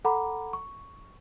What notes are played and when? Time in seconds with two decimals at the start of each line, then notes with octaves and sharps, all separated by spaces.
0.05 A4 F#5 A#5 B5 D6
0.53 C#6